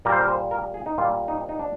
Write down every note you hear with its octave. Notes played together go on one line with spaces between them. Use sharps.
A#2 G3 A#3 A#4
C5
A#4
C5
A#4
G#4
D#4
A#2 G3 A#3 F4
D#4
D#4
D4